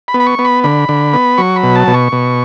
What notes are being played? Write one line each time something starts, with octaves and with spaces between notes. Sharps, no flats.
B5
B3
B5
C#6
B3
B5
D3 B5
D3
B3
F#3 C#6
B5
B2
A5
B2
C#6
B2